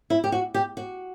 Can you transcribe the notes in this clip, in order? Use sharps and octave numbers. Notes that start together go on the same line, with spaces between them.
E4
G4
F#4
G4
F#4